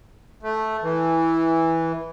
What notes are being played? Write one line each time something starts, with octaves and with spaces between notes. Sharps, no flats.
A3
E3